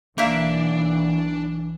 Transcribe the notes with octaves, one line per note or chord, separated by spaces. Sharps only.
B1 E3 A#3 D4 E5